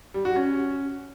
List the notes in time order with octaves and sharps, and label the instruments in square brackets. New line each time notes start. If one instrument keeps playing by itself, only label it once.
[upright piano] G3
F#4
C#4